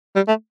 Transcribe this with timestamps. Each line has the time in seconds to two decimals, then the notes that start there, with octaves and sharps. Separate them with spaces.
0.16 G3
0.28 A3